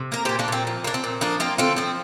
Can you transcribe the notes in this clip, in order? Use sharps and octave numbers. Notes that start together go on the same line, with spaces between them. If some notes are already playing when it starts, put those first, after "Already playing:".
Already playing: C3
A#3 A#4
A#2 G4 C5
A#3 D4
A#2 C4
F3
A#3 D4
C4
A#2
F3 A#3 D4
A#3 C4 F4
D3 C4 F4
F3 C4